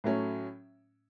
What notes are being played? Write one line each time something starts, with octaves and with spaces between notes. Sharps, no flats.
A2 F#3 A3 C#4